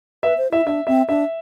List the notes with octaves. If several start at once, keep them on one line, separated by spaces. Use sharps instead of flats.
B4 E5
C5
E4 E5
D4 E5
C4 E5
D4 E5